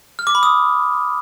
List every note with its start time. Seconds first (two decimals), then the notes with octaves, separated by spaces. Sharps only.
0.19 F6
0.27 D6
0.35 B5
0.43 D#6